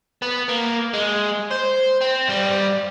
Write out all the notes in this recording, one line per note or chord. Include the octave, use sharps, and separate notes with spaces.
B3
A#3
G#3
C5
C4
G2 G3